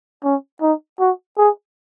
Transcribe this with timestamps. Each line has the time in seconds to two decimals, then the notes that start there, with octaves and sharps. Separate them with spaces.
0.24 C#4
0.62 D#4
1.00 F#4
1.38 G#4